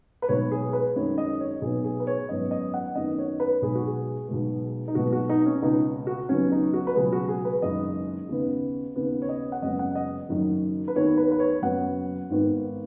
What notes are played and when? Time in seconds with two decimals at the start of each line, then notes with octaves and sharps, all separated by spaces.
0.22 B4
0.28 B1 B2 G#3 B3 C#5
0.51 G#4
0.73 B4
0.96 F#2 D#3 G#3 C#5
1.18 D#5
1.41 C#5
1.62 B1 B2 B3 G#4
1.85 G#4
2.00 B4
2.07 C#5
2.29 G#1 F#2 F#3 B3 D#5
2.51 D#5
2.74 F#5
2.95 F#2 D#3 B3 D#5
3.18 C#5
3.40 B4
3.62 B1 B2 G#3 G#4
3.75 F#4
3.87 G#4
4.28 B1 B2 G#3
4.88 D#4
4.95 B1 B2 G#3 B3 F#4
5.12 F#4
5.29 D#4
5.46 C#4
5.62 C#2 B2 B3 D#4
6.07 F#4
6.29 D#2 C#3 F#3 B3 C#4
6.52 D#4
6.74 F#4
6.87 B4
6.96 C#2 B2 F#3 G#4
7.12 F#4
7.29 G#4
7.45 B4
7.62 F#1 F#2 D#3 G#3 D#5
8.29 D#2 C#3 B3
8.96 D#2 C#3 B3
9.22 C#5
9.29 D#5
9.52 F#5
9.62 F#1 F#2 C#3 G#3 B3 D#5
9.79 F#5
9.95 D#5
10.29 F#1 F#2 D#3 F#3
10.88 B4
10.96 D#2 D#3 B3 C#5
11.18 B4
11.32 B4
11.40 C#5
11.62 F#1 F#2 F#3 B3 F#5
12.30 G#1 G#2 D#3 B3